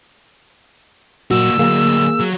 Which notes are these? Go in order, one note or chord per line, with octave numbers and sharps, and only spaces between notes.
A#2 F#3 A#3 F#4 E6
D3 F#3 A#3 G#4
F#3